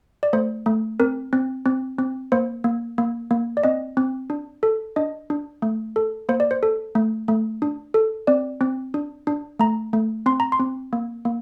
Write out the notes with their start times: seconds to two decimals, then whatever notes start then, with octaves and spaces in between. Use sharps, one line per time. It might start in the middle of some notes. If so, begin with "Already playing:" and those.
0.23 D5
0.33 A3 C5
0.66 A3
1.00 C4 A#4
1.33 C4
1.66 C4
1.99 C4
2.32 A#3 C5
2.64 A#3
2.98 A#3
3.31 A#3
3.57 D5
3.63 C4 D#5
3.97 C4
4.30 D4
4.63 A4
4.96 D4 D#5
5.30 D4
5.62 A3
5.96 A4
6.29 A#3 C5
6.40 D5
6.51 C5
6.63 A4
6.95 A3
7.28 A3
7.62 D4
7.94 A4
8.27 C4 D5
8.61 C4
8.94 D4
9.27 D4
9.59 A3 A#5
9.93 A3
10.26 C4 C6
10.40 A#5
10.52 C6
10.60 C4
10.93 A#3
11.25 A#3